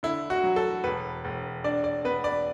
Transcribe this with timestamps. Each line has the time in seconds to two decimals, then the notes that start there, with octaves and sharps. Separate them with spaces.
0.03 D3 E4
0.30 F#4
0.43 F#3
0.56 A4
0.84 E1 B4
1.25 E1
1.64 D4 D5
1.84 D5
2.05 B3 B4
2.24 D5